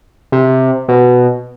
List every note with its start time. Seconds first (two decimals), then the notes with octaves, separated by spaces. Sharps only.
0.32 C3
0.88 B2